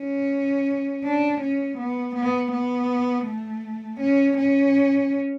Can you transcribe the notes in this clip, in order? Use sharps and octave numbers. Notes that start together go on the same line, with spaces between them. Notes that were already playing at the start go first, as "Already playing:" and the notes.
Already playing: C#4
D4
C#4
B3
B3
B3
A3
C#4
C#4